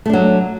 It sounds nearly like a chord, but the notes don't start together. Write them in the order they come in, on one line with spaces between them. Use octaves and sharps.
A3 D4 F#3